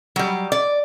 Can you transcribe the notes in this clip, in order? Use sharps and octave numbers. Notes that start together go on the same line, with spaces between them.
F#3 G3
D5